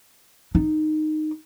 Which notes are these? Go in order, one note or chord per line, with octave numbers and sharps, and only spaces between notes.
D#4